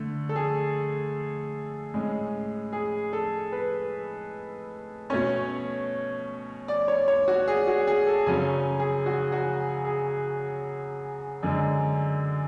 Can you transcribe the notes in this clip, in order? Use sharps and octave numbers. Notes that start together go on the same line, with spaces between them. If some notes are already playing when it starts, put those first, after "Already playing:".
Already playing: D3 A3
A4
G#4
A2 G#3 C#4
G#4
A4
B4
B2 A3 C#4 C#5
D5
C#5
C#5
F#4
G#4
F#4
G#4
A4
F#2 C#3 F#3 C#4 G#5
G#4
F#4
F#4
G#4
F#2 D3 G#3